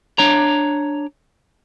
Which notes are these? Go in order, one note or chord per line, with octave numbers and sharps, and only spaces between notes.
D4 C#5 A#5